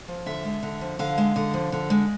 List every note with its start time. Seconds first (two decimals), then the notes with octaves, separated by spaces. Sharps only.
0.08 F3
0.26 D3 E5
0.45 G#3
0.63 D3
0.81 F3
0.99 D3 F5
1.18 G#3
1.36 D3
1.54 F3
1.72 D3
1.90 G#3